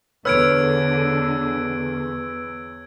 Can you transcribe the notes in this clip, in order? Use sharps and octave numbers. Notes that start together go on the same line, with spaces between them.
E2 D3 B4 C#5 E6 F6 G#6 D7